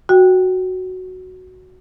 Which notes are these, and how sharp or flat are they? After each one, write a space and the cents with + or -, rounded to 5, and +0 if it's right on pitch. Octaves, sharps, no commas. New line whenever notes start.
F#4 +0 G5 +0